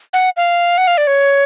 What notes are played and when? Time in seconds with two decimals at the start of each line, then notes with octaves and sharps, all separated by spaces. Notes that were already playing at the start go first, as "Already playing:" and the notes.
0.13 F#5
0.37 F5
0.78 F#5
0.87 F5
0.98 D5
1.07 C#5